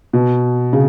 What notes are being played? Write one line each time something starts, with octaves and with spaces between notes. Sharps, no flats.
B2
C#3